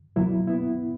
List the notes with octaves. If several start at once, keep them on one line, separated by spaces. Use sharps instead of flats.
C#2 B2 F#3 A#3 E4
B3 E4